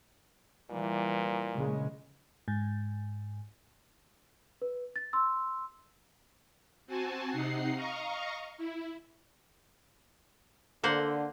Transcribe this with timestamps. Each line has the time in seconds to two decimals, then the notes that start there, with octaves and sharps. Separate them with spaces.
0.70 A#2 E3 G3
1.54 A#1 C#3 G#3
2.48 G#2
4.62 B4
4.96 A6
5.13 C6 E6
6.86 C4 F#4 G#5 A5
7.31 C3 D#4 F#5 C7
7.73 D#5 F5 A#5 C#6
8.58 E4
10.84 D3 A#3 C5 F#5